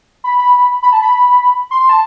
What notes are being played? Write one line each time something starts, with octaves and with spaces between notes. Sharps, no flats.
B5
B5
B5
A5
B5
C6
A5